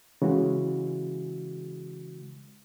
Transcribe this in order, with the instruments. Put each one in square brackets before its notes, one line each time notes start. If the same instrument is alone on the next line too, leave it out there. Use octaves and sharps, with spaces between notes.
[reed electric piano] C#3 E3 G#3 F#4